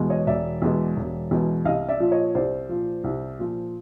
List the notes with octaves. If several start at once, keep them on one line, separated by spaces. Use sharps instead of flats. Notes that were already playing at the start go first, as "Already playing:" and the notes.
Already playing: E2 B2 G#3
C#5 D#5
E1 D5 E5
E2 B2 G#3
E1
E2 B2 G#3
C2 D#5 F5
D5 E5
A#2 F3
C#5 D#5
C2 C5 D5
A#2 F3
C2
A#2 F3